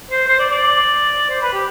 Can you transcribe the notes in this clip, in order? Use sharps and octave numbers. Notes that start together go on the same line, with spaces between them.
C5
C5
D5
D5
C5
B4
G4